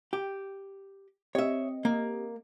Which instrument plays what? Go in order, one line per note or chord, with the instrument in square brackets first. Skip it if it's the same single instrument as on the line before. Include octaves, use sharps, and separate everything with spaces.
[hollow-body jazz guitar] G4
[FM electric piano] C4 G4 D#5 [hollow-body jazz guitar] C#5 E5
[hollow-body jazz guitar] A#3